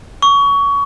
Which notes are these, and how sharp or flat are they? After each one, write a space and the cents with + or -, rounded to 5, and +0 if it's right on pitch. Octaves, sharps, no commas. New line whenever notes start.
C#6 +25